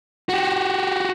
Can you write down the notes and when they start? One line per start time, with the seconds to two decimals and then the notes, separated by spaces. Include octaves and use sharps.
0.29 F#4 G4